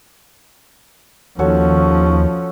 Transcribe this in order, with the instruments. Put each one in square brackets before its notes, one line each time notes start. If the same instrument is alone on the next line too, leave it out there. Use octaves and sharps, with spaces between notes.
[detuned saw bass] D#2 [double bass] F3 C#4 [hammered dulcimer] F#4 A4 C#5